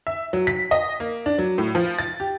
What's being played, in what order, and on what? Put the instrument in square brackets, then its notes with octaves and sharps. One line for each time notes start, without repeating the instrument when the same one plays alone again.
[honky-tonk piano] E5
F#3
B6
D#5
A#3
D4
F#3
A2
F3
A6
G4